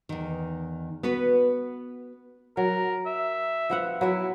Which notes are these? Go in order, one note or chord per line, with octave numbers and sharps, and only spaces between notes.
E2 D#3
B3 F#4 B4
F#3 A#4
E5
F3 B3 F#5
F#3 E4 B4 E5